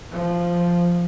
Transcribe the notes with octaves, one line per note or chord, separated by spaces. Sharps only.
F3